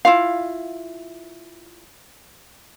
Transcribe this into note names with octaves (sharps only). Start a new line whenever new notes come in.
E4 F4 F5